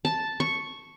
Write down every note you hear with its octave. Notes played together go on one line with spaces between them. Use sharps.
A5
C#6